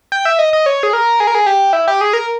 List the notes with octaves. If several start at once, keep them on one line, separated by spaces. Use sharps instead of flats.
G5
E5
D#5
D#5
C#5
G#4
A#4
G#4
A#4
G#4
G4
E4
G4
G#4
A#4